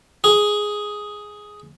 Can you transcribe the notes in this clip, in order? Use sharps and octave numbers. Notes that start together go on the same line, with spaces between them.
G#4